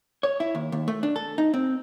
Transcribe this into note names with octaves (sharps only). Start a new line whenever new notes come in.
C#5
E4
D#2
D#2
A3
D4
A4
D#4
C4